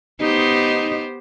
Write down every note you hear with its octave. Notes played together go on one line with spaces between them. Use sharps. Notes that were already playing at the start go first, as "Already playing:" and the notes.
B3 D#4 G4 C5